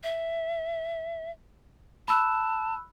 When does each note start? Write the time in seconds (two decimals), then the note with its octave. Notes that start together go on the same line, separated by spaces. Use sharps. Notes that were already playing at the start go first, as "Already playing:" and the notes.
0.03 E5
2.08 A5 B5 E6 F#6